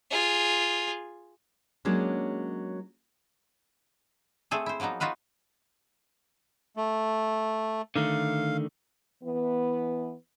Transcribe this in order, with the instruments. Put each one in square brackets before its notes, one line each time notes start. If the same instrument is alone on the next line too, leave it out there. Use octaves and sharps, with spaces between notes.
[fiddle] F4 G#4
[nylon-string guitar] F#3 G#3 A#3 C#4 D4
[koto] A3 C4 G#4 A4
E4 C5
F3 F#3 A#3 B3 D#4
D#4 F4 F#4 B4 F5
[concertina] A3
[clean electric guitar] D3 D#3 A3 [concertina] F5
[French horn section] E3 B3